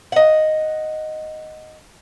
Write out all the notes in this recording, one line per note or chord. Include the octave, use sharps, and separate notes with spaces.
D#5 F#5